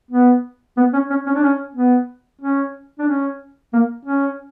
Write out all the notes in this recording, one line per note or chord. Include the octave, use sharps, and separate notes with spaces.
B3
B3
C#4
C#4
C#4
D4
C#4
B3
C#4
D4
C#4
A#3
C#4